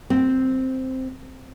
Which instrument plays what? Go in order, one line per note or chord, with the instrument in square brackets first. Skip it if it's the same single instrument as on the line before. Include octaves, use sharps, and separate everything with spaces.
[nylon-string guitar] C4